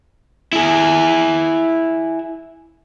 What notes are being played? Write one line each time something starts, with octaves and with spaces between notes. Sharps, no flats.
E4 G#4